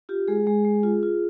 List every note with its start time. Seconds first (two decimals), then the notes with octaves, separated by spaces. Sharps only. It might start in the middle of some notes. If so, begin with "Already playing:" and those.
0.09 F4 G4
0.28 G#3 G#4
0.47 G#3
0.65 G#3
0.83 F4
1.03 F4